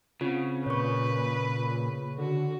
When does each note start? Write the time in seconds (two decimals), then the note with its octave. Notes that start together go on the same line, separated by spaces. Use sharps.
0.21 C#3 C4 F4
0.66 A#2 B4 C#5 C#6
2.18 D3 F#4